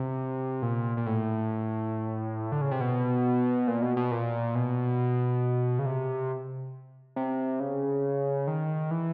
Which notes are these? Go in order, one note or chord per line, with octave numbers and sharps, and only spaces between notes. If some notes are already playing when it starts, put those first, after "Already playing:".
Already playing: C3
A#2
A#2
A2
D3
C#3
C3
B2
A#2
B2
B2
A#2
B2
C#3
C3
C3
C#3
D#3
E3